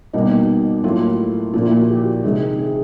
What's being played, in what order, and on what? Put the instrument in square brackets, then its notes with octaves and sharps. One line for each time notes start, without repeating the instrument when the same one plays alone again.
[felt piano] B2 G3 A#3 D#4
A2 F#3 A#3 F4
A#2 F3 A#3 F4
E4
F#4
G4
C3 D#3 G#3
G#4